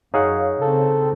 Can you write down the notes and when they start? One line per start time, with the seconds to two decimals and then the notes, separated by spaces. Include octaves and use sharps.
0.14 F#2 D#4 G#4 C#5 F5 F#5
0.61 C#3 C4 A4